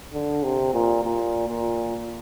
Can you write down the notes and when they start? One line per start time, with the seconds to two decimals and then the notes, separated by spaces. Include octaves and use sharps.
0.13 D3
0.43 C3
0.73 A#2
1.04 A#2
1.48 A#2